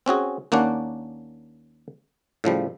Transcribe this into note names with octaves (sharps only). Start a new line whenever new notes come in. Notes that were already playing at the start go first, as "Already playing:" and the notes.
C4 C#4 F#4 G#4
D#2 A#3 C#4 D4 F#5
A2 C#3 F3 G3